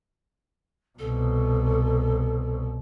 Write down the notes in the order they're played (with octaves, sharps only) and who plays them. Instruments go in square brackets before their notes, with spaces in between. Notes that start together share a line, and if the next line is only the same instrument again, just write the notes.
[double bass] C2 B2 [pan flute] A4